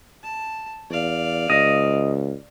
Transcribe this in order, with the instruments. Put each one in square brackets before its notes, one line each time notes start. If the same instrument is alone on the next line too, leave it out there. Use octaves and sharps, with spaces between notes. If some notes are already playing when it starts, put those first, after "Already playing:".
[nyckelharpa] A5
[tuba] E2 [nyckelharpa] D5 F5
[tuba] C#2 [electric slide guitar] D#5